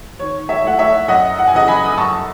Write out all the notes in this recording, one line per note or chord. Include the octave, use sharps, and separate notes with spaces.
D#3 C#5
C#5 E5
A3 E4 F#5
C#5 E5
F#2 D#5 F#5
F#5
G#5
C#3 E3 D#5 F#5
G#5 B5
D#6
F#2 A5 C#6